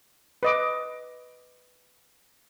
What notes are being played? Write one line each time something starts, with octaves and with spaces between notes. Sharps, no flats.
B4 D#5 D6